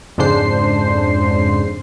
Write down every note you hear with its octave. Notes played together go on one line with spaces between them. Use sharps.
F2 G#2 C#3 D4 C5 C7